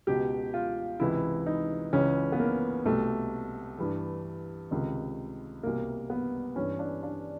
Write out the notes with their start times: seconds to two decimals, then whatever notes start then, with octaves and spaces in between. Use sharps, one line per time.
0.07 C#2 B2 G4
0.54 F4
1.00 C#2 C3 E3 E4
1.46 D#4
1.93 C#2 C#3 E3 C#4
2.32 B3
2.39 A#3
2.85 C2 B2 A3
3.79 G2 E3
4.71 C#2 C3 D#3
5.63 C2 B2 A#3
6.10 B3
6.56 G2 E3 C#4
6.79 D4
7.03 D4